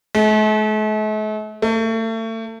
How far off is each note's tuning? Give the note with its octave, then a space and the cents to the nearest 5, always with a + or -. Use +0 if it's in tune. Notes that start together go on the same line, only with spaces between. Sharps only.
A3 -45
A3 +35